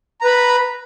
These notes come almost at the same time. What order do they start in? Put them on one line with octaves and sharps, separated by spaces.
A#5 B4 B5